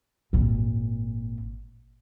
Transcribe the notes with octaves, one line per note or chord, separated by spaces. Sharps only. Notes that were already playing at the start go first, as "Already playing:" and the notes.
G#1 A#2